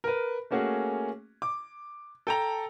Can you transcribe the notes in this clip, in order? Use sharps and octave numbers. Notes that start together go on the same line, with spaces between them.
A#4 B4
A3 A#3 C#4 F#4 G#4
D6
A4 G5 A5 A#5